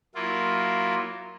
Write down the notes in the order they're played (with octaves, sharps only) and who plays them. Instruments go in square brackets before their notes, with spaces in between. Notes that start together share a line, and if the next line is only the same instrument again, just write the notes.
[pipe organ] F#3 A#3 E4 F4